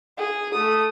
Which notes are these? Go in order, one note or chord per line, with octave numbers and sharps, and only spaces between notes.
G#4
A3 D#6